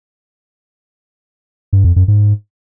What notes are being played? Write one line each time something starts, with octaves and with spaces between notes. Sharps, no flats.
G2
F2
F#2
G#2